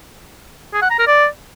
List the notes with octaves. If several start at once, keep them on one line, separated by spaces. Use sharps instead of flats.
G#4
F#5
A#5
A#4
D5